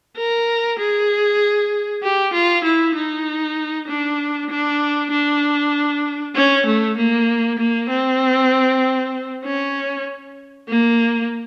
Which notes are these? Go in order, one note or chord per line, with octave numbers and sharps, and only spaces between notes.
A#4
G#4
G4
F4
E4
D#4
D4
D4
D4
C#4
A3
A#3
A#3
C4
C#4
A#3